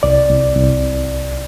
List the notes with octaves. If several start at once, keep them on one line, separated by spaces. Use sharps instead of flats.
C2 D5
C2
C2